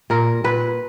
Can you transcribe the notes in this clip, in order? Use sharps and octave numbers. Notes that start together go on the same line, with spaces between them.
A#2 A#4
A#2 B4